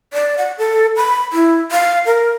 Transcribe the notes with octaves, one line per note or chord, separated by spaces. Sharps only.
D5
F#5
A4
B5
E4
F5
A#4